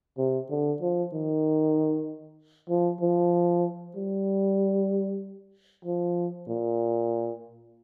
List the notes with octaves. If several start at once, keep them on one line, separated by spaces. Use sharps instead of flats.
C3
D3
F3
D#3
F3
F3
G3
F3
A#2